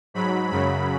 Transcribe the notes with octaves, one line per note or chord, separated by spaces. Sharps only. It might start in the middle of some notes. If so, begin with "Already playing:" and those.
G#2 F#3 B5
F#2 C#3 F#3 B5